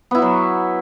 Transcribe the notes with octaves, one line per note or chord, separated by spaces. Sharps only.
F#3 B3 E4 F#4